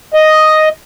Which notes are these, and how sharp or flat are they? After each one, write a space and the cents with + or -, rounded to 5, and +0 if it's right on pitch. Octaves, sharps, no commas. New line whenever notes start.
D#5 +0